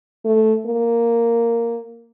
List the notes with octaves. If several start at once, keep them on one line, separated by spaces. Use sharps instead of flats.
A3
A#3